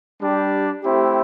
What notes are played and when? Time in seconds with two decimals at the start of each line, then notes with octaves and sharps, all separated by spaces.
0.21 G3 D4 G4
0.82 A3 C4 E4 G4